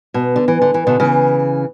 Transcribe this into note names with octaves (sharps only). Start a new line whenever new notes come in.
B2
D3
E3
D3
E3
B2 D3
C#3 E3